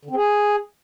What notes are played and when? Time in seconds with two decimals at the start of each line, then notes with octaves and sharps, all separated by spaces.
0.05 D3
0.10 C4
0.16 G#4